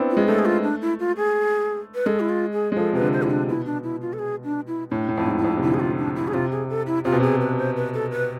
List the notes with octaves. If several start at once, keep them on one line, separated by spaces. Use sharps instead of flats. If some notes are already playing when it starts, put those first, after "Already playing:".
Already playing: B3 C4 D4 E4
F4
G#3
A3 A4
G#4
F4
D4
E4
F4
G#4
B4
G#3 A4
E4
F4
G#4
G#3
F3 A4
C3 B4
D3
C5
C3 E4
D4
B2 E4
D4
E4
F4
A4
G#4
D4
E4
A2 D4
A2
F2 E4
G#2
E4
F2
C3
D3 E4
G#4
F4
D4
E4
G#4
C3 F4
G#4
A4
E4
C3 F4
B2
C3 G#4
B4
C5
B4
A4
B4